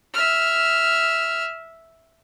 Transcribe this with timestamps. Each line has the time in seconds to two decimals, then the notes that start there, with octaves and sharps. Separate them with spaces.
0.14 E5 F6